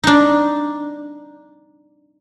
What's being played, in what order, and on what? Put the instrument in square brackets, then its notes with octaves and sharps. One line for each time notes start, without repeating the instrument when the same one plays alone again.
[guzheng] D4 D#4